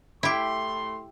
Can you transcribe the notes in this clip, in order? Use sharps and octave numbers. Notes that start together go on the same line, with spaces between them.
A2 A3 E4 G4 C6